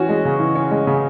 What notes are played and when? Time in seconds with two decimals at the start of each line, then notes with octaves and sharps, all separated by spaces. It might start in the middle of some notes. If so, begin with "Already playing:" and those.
Already playing: E3 C#4 F#4
0.09 G#3
0.25 C#3
0.40 E3
0.55 C#4
0.71 G#3
0.87 C#3